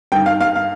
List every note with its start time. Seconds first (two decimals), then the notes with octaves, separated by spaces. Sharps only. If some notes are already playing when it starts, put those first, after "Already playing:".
0.12 G2 D#3 G5
0.26 F5
0.41 F5
0.56 F5